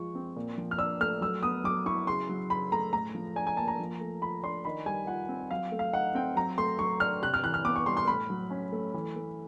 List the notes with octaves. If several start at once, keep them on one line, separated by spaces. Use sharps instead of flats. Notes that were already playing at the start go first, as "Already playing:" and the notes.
Already playing: F3 G#3 F4 C#6
C4
A#2
F3
F6
D4 E6
A3 F6
F#3 E6
B3 D#6
F#3 D6
E4 C#6
C#3 C6
F#3
C#3 B5
A3 A#5
A2 A#5
F3
D4 G#5
G#5
A#3 A5
A#5
F3
A3
F4 B5
D4 C6
D#3 B5
G3 G#5
F4 F#5
C4
F#3 F5
A3
F5
D#4 F#5
C4 G5
F#3 A#5
A3 C6
F#3 C#6
D4 F6
C3 F#6
F6
E3 F#6
F6
B3 D6
C#6
G3 C6
C6
A2 B5
F#3
C#4
A3
E3
A3